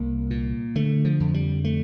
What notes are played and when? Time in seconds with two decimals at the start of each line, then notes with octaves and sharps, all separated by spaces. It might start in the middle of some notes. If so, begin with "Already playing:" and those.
Already playing: C2 A#3
0.30 A#2
0.75 D3 A3
1.05 F3
1.20 F2
1.34 G3
1.64 A3